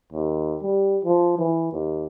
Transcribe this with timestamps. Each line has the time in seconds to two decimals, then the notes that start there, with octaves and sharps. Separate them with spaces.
0.13 D#2
0.62 G3
1.05 F3
1.39 E3
1.73 D#2